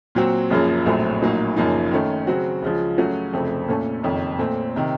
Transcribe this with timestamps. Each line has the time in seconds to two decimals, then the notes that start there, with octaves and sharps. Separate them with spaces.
0.15 A#2 F#3 C4 F#4
0.50 F#1 F#2 C#3 F3 A#3
0.86 A#1 A2 F#3 A3 C4
1.21 A#1 A2 F#3 A#3 D#4
1.56 F#1 F#2 F3 A#3 D#4
1.91 D#3 A3 C#4
2.27 C#3 F#3 C4 F#4
2.62 C#2 C#3 F3
2.98 C#3 F#3 A3 C#4 F#4
3.33 F1 F2 C#3 A3 C4
3.68 A#2 A3 C#4 A4
4.03 F#1 F2 D#3
4.38 A#2 A3 C4
4.76 C3 D#3